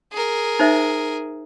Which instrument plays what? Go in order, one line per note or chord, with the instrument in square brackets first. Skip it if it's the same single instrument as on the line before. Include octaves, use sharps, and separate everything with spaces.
[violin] G#4 A#4
[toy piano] D#4 C5 E5